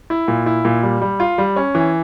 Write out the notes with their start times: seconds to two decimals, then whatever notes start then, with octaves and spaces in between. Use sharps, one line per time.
0.10 E4
0.28 A#2
0.46 E4
0.65 A#2
0.83 G3
1.01 G3
1.20 F4
1.38 G3
1.56 C#4
1.75 E3